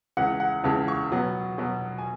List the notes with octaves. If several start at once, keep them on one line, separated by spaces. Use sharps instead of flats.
C#2 C#3 E3 F#5
F#5
C#2 C#3 E3 A5
C#6
B2 F#3 B3
B2 F#3 B3
G#5